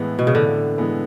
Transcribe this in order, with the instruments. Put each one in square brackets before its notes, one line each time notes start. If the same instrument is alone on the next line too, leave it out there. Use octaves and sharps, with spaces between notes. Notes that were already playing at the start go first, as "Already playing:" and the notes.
Already playing: [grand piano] A2 E3 G#3 B3
[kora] B2
C#3
[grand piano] A2 [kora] D3
[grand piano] E3 G#3 B3